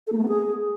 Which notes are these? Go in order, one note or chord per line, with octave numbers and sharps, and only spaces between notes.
A4
A#3
A3
B3
G#4